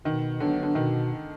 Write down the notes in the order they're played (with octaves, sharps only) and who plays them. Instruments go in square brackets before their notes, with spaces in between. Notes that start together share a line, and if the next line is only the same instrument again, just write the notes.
[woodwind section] B2 [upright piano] D#3
[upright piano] D3 [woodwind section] F#3 B3 D4
[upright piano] D3
[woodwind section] B2 [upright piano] D#3